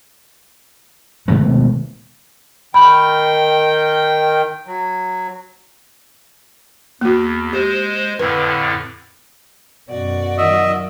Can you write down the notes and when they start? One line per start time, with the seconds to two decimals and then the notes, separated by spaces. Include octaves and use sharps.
1.28 B2 D#3 G#3 A3
2.74 D#3 G5 B5
4.66 F#3
7.01 E2 A#3 F#4
7.53 G#3 G4 C5
8.19 F2 A2 D3 B4
9.88 F#2 B2 F#4 D5
10.38 D#3 F#3 D#5 E5